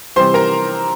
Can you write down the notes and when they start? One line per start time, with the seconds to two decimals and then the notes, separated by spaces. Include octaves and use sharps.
0.16 C3 E3 G3 C5 C6
0.34 A#4 A#5